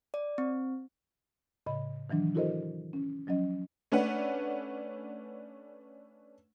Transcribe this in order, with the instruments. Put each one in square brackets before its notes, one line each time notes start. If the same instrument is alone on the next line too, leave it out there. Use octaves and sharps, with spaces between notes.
[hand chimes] D5
C4
[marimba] A2 C#3 D#5 B5
D#3 E3 F#3 D4
E4 F#4 A4 A#4 C5 D#5
C#4
F3 F#3 C#4 D#5
[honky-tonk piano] A3 C#4 D4 B4 F#5